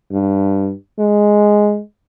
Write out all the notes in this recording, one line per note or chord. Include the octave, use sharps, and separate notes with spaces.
G2
G#3